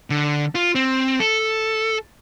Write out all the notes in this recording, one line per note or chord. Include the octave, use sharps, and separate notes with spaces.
D3
F4
C4
A4